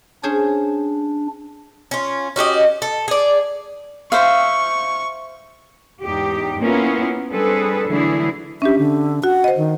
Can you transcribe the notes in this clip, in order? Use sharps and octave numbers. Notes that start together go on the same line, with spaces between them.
C#4 D4 G#4 C5
C#4 F4
C#4 F#4 G4 D#5
A4
G#4 D5
C5 E5 F5 C#6
E2 G#2 D#4 G4
A#3 B3 C#4 E4 F4 A#4
G3 C4 D4 G#4 A4 B4
D3 E3 F#3 A3 E4 G#4
C#4 D4 G4 E5
D3
F#4 F#5
C5 D#5
D#3